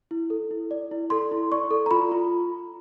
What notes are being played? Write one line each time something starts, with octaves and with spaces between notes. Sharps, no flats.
E4
A4
E4
D5
E4
A4 C6
E4
D5 C#6
A4
A#5
F4 B5
F4